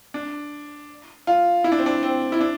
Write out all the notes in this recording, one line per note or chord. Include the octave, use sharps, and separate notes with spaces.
D4
F4
E4
D4
C4
D4
C4
E4
D4